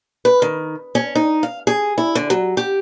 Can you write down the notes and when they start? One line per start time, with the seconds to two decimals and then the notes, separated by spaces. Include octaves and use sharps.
0.25 B4
0.42 D#3
0.95 C#4
1.15 D#4
1.43 F5
1.67 G#4
1.98 E4
2.15 D3
2.30 F#3
2.57 G4